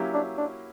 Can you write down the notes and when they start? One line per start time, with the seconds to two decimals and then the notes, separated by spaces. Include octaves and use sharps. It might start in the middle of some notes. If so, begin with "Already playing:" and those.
Already playing: F#3 A#3 C#4 E4 G4
0.14 D4
0.38 D4